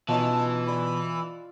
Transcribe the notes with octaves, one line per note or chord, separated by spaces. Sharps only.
B2 E3 C#4 D#4 F4 A5
D5 B5 C6